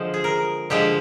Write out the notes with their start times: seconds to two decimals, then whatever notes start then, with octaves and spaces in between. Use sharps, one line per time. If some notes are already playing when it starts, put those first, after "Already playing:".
Already playing: D3 F3 G#3 C5
0.14 G#4
0.24 A#4
0.70 D3 F3 G#3 G4